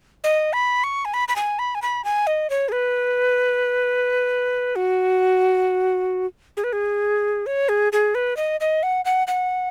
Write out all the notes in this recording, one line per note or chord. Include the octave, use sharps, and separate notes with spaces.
D#5
B5
C#6
G#5
B5
B5
G#5
B5
G#5
B5
G#5
D#5
C#5
G#4
B4
F#4
G#4
B4
G#4
C#5
G#4
G#4
B4
D#5
D#5
F#5
F#5
F#5